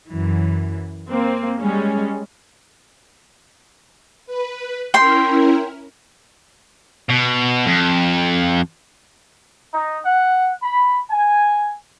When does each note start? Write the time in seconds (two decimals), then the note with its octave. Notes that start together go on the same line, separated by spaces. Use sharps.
0.13 F#2 E3
1.09 A#3 C4
1.60 G3 G#3 C#4
4.26 B4
4.94 C#4 E4 A#4 G5 C6
7.10 B2
7.66 F2
9.74 D#4
10.05 F#5
10.62 B5
11.11 G#5